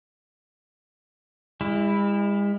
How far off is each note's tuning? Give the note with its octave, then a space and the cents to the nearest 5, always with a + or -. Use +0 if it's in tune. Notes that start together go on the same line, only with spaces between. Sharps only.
G#3 -45 E4 +0